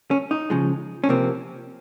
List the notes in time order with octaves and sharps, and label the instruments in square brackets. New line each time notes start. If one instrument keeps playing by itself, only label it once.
[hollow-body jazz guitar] C#4
D#4
C#3 F3 G#3
C#4
C3 F3 A#3 C4